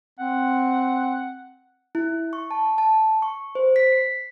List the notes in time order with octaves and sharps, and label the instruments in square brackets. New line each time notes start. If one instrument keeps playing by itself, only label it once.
[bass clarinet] C4 [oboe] F#5
[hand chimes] E4
C#6
A5
A5
C#6
C5
B6
C7